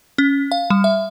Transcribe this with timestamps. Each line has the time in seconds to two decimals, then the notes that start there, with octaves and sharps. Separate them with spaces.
0.18 C#4
0.52 F5
0.70 G3
0.84 E5